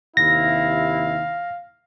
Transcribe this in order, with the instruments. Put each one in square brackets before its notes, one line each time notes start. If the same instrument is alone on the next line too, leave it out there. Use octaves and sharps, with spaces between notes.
[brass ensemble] D#2 C3 E4 [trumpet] F5 [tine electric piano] A#6